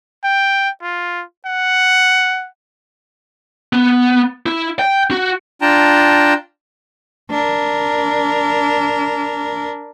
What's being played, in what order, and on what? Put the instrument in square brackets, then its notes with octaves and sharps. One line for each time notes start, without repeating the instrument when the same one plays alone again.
[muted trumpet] G5
F4
F#5
[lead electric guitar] B3
E4
G5
F#4
[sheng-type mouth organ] D4 F4 G5 A5 A#5
[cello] D4 A#4